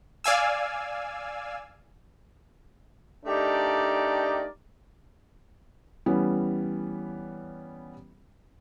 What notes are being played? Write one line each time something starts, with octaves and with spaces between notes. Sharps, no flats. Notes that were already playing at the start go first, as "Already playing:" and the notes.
D5 F5 G#5 E6
A3 D4 D#4 G4 A#4 D5
E3 G3 B3 C#4